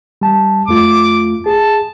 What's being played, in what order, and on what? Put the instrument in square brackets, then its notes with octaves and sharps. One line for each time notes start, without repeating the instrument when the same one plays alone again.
[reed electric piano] G3 A5
[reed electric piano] F2 A3 F4 [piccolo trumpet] D6
[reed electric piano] G#4 [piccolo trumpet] A5